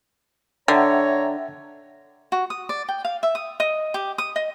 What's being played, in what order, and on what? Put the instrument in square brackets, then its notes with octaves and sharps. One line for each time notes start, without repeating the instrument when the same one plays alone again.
[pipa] D3 [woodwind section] C#5 A#5 [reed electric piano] E5 F#5 G5
[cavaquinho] F#4
D#6
D5
G5
F5
E5
D#6
D#5
G4
D#6
D#5